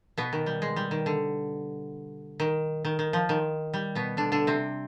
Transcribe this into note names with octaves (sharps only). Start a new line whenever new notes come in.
B2 B3
D#3
G3
G#3
G3
D#3
D3
D#3
D#3
D#3
F3
D#3
G3
B2 B3
D3 D4
D3 D4
C3 C4